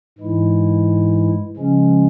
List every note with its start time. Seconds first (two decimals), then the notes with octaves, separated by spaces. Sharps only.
0.18 G#2 E3 G#3 E4
1.57 C#3 F3 G#3 C#4